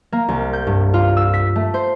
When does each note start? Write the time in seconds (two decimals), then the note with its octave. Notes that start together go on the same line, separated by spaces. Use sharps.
0.12 A#3
0.28 C2
0.53 G6
0.67 G2
0.94 F4
1.17 E6
1.33 B6
1.56 A3
1.74 C5